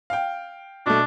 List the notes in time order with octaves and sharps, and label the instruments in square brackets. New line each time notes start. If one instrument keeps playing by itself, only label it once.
[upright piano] F5 G5
[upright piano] B2 A3 [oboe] D4